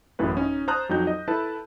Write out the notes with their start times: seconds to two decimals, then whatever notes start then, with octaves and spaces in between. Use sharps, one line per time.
0.19 A1 F#2 A2 B4
0.37 C#4 D#4
0.68 C5 A5 A#5 D#6 F6 F#6
0.89 F2 F#3 D#4 G6
1.07 D#5
1.28 E4 A4 B4 A5